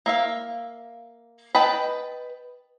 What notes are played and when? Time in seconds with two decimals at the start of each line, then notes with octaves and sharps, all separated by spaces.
0.06 A#3 E5 F5
1.55 B4 D#5 G5 A5 B5